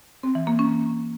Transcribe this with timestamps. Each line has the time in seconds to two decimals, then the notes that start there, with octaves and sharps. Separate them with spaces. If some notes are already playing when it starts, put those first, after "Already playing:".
0.23 C4
0.35 E3
0.47 A#3
0.59 C#4